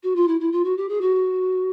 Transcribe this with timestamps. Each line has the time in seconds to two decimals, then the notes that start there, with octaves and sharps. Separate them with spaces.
0.03 F#4
0.15 F4
0.27 E4
0.40 E4
0.52 F4
0.64 F#4
0.77 G4
0.88 G#4
1.01 F#4